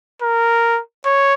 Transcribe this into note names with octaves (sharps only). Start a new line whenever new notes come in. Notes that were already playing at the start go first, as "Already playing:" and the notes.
A#4
C#5